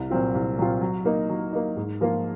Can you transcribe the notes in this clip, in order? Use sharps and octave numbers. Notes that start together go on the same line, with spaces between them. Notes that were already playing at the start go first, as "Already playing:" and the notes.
Already playing: C2
A#2 F#3 C4 F4
C2
A#2 F#3 C4 F4
F#3
A#3 D#4
F#3
A#3 D#4
G#2
F3 A#3 F4